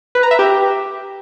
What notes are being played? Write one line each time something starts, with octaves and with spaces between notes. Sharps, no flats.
B4
A#5
E5
G4